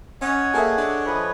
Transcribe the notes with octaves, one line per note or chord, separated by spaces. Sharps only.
C#4 C#5 D#5 F#5
A#3 G#4 A4 E5
D4 D6
F3 B4 D#5 B5 D#6